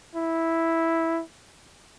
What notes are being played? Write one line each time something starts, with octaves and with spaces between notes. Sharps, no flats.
E4